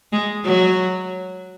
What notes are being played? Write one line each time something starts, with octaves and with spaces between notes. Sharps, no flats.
G#3
F#3